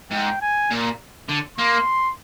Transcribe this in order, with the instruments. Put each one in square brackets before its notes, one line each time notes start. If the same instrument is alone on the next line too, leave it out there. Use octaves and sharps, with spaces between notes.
[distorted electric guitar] G#2 [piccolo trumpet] G5
[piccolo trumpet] G#5
[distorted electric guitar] A#2
D3
[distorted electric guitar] A#3 [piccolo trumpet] C6